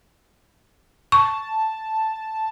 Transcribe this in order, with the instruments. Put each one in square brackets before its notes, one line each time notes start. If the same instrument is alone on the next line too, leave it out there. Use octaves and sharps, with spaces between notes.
[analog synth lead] A5 [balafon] C#6